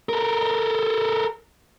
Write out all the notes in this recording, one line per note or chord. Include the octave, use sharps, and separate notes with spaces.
A4 A#4